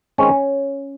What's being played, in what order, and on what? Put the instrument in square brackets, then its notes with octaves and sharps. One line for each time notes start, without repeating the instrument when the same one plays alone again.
[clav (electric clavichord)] D#3 G#3 C4 C#4 C#5